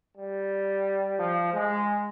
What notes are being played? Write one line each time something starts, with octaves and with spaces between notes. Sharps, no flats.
G3
F3
G#3